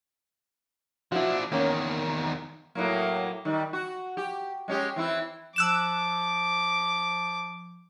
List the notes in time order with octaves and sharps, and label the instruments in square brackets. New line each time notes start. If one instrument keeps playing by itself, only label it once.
[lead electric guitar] F3 D4 [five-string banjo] E4 F#4
[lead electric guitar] E2 D#3 [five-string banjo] A#3 C#4
[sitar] A2 F#3 A#3
D#3 G3
F#4
G4
G#3 C#4 G4
E3 C4 E4
[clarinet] F3 [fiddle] D6 [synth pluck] E6 F#6 E7